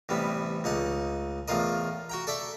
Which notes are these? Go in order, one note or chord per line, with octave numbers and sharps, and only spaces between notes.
A1 C3 G3 B3
C#2 D#4 F#5 A5
E2 A2 F4 A#4 D#5
F#4 G5 A#5
A4 D5 E5 G5